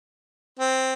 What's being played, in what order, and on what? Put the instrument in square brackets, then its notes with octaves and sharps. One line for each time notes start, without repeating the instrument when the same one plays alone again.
[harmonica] C4